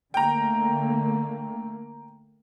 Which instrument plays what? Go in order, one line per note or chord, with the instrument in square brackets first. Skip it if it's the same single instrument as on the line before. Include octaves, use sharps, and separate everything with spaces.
[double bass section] D3 A3 A#3 [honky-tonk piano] G5 A#5